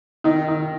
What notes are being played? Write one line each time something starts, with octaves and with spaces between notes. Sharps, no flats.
D#3 D#4
D#3